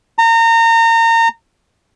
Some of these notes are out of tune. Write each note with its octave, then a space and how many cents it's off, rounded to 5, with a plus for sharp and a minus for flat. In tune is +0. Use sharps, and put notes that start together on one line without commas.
A#5 -30